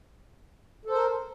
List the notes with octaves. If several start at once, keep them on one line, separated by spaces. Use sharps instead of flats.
A4 A#4 C5